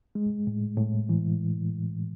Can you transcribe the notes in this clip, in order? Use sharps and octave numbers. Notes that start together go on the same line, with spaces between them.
G#3
A2
A2
E3